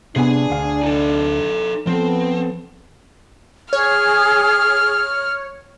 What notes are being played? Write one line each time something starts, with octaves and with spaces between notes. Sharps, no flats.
C3 B3 D4 G#4 G#5
D2 F5
D#4 A4
F3 B3 C4 A4
G#4 C#5 F6